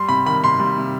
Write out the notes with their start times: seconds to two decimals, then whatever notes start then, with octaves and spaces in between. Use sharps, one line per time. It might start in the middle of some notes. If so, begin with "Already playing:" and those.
Already playing: G3 C6
0.09 C3 B5
0.26 D#3 B5
0.44 C3 C6
0.60 G3
0.78 C3